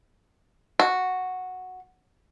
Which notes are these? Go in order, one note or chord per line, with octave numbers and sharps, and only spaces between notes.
F#4